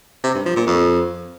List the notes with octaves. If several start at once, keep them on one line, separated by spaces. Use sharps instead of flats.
C3
G2
F3
A#2
F2